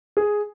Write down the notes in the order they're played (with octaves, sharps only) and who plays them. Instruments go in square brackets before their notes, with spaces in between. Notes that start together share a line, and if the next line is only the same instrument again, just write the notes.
[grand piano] G#4